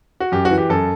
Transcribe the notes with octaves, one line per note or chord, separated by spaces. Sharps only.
F#4
F#2 G4
F#4
E3
G4
F#2 A4